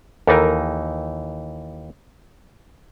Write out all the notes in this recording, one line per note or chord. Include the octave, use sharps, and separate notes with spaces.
D#2 E3 D#4 A4 A#4